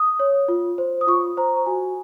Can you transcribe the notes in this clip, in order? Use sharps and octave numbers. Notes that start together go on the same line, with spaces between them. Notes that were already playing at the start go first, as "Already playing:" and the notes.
Already playing: D#6
C#5
F4
C5
D#6
F4 C#6
C5 A#5
A#5
F#4 G#5